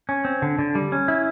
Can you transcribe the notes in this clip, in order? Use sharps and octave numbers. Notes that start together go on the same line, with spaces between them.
C#4
C4
D3
D3
G3
C#4
E4